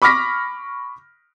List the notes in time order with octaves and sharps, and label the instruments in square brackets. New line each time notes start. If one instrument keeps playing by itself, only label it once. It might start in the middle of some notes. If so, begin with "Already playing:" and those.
[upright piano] B5 C#6 D6 F6 A#6 B6